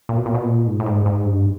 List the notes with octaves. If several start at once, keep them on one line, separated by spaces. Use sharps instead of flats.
A#2
B2
A#2
B2
A#2
G#2
A2
G#2
G#2
G2